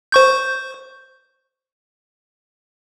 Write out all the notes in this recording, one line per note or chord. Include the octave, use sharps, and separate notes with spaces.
C5 C#6 G6